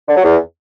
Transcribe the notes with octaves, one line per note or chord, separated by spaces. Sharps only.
D3
F#3
E2